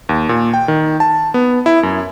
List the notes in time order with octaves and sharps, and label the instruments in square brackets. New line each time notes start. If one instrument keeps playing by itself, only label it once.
[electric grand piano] D#2
A#2
G5
D#3
A5
B3
E4
F#2